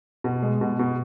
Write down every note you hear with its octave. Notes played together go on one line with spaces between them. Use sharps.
B2
G#3
B2
B2